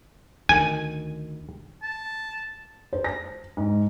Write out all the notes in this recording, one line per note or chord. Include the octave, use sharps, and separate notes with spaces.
D2 D#3 G#5
A5
C5
A#6
G#2